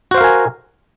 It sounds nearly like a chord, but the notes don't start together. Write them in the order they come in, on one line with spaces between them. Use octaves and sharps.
F#4 C5 F5 A#4 G#5